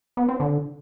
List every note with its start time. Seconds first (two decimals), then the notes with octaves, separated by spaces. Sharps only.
0.17 B3
0.29 C4
0.40 D3